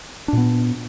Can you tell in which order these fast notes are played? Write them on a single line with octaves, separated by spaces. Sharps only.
D4 A#2 B3